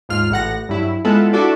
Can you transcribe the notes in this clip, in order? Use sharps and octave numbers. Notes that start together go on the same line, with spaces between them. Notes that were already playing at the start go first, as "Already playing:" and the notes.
D#2 G#2 F4 F6
A1 A2 F#5 A#6
G2 F#3 E4
G#3 B3 E4 F4 A4 F#5
D4 E4 F#4 A4 D5